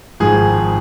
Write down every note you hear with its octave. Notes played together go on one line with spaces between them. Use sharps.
G#1 G#2 F3 G#4